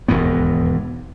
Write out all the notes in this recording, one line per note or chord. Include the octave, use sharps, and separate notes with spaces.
E1 D#2 G#2 B3